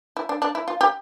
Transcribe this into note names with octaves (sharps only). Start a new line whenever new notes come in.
E4
D4
D4
E4
F4
G4